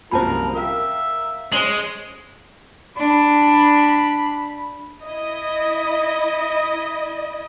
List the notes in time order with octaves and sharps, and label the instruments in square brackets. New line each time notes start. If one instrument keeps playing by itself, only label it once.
[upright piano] C2 F#2 A#2 [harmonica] F3 A#4 [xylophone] C5 A5 B5
[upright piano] A#4 F5 G5 [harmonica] E5
[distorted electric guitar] G#3 [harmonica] C#4 [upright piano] C5 C#5 C6 [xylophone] F#7 G7
[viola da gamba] D4 [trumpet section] B5
[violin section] E4 D#5